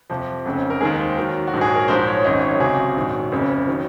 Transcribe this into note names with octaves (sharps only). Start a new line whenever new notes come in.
F2 C3 F3
F1 F2 C#3
A#4
D#2 D#3 G#3 G#4
C5
D#2 D#3 F#3 A#4
F#4
A#1 G#2 F#3
G#4
A#4
A#1 G#2 F3 G#3 C5
C#5
C#5
G#1 F#2 D#3 D#5
C#5
C#2 C3 F#3 G#4
A#1 G#2 D#3 F#3
F#1 F2 C#3
D#3 F#3